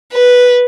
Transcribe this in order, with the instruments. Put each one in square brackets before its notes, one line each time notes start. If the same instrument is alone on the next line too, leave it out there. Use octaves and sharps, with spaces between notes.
[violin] B4